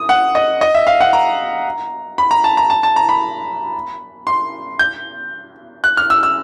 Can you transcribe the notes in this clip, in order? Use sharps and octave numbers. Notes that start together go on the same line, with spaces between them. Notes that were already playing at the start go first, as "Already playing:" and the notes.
Already playing: D#6
F#5
D#5
D#5
E5
F5
F#5
A#5
B5
A#5
A5
A#5
A5
A5
A#5
B5
C6
G6
F#6
F6
E6
E6